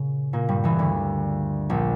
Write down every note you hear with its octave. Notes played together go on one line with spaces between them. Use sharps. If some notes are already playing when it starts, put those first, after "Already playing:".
Already playing: A#2 C#3
A#2 A#3
G2 G3
E2 E3
D2 D3
A#1 A#2